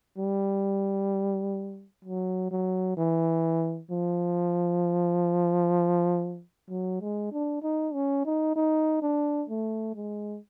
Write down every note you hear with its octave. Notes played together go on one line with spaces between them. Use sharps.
G3
F#3
F#3
E3
F3
F#3
G#3
D4
D#4
C#4
D#4
D#4
D4
A3
G#3